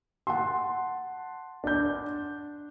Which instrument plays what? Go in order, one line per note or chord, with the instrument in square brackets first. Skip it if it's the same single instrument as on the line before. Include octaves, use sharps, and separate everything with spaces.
[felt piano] F#5 A5 C6
[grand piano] D4 G6